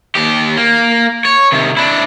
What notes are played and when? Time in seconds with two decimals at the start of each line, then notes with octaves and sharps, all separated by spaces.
0.15 D#2 G4
0.57 A#3
1.25 C#5
1.52 C3 D#3
1.77 D4 E4